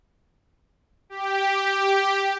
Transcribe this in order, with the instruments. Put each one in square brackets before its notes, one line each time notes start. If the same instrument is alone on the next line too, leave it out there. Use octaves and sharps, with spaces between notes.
[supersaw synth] G4